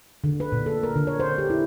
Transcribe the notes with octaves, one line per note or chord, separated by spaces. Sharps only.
D3
B4
A#2
A4
A#4
D3
C#5
C5
G4
E4